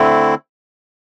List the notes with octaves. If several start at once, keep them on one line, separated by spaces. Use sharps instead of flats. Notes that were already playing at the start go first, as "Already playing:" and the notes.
Already playing: D3 A3 C4 E4